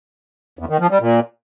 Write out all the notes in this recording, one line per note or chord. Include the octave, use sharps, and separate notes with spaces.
E2
D#3
F3
G3
A#2